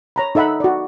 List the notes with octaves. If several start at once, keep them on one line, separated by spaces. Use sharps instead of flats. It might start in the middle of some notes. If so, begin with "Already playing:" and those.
C#5 A#5 B5
D#4 A4 E5 F#5 B5
F#4 D5